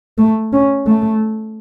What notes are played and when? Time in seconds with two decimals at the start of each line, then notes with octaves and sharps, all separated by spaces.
0.18 A3
0.53 C#4
0.87 A3